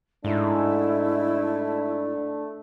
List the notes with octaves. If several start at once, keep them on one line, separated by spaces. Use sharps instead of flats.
G#2 A3 D4 E4